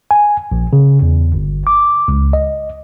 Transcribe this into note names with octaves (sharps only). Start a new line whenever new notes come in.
G#5
A#1
C#3
E2
G1
D6
C#2
D#5